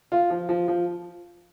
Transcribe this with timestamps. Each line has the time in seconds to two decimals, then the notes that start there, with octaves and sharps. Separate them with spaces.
0.12 F4
0.30 F3
0.49 F3
0.68 F3